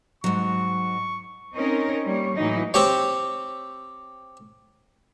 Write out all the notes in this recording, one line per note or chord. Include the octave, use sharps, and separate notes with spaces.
G#2 F#3 C#6
C4 C#4 D#4 A#4 C#5
G3 A#3 C#5
A2 E3 F#3 D#4
C4 G4 C#5